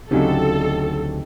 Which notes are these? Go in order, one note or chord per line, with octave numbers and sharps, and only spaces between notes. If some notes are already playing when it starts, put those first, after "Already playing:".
D2 C#3 F#3 C4 D#4 G4 A4